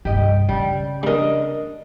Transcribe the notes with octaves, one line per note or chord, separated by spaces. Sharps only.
G2 C3 G4 D#5
C#3 G3
G3 D4 A#4 D#5